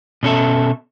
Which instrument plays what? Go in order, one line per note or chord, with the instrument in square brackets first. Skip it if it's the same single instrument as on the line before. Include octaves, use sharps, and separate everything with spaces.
[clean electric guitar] B2 C#4 A4 E5